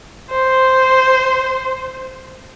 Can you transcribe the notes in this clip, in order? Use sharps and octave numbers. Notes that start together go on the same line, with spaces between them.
C5